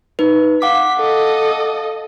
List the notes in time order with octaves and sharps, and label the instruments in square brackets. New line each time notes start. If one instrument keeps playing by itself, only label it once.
[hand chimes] D#4 B4
[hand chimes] F5 F#5 D6 [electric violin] B6
[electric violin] A4 D#5